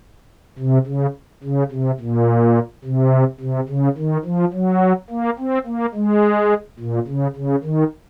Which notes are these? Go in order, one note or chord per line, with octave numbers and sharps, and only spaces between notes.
C3
C#3
C#3
C3
A#2
C3
C3
C#3
D#3
F3
F#3
A#3
C4
A#3
G#3
A#2
C#3
C#3
D#3